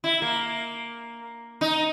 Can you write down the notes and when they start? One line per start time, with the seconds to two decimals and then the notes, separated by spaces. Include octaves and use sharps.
0.04 E4
0.22 A#3
1.61 D#4